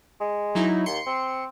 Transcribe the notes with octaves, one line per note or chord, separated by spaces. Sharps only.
G#3
F#3 D#4 E4
D#2 C6 C#7
C4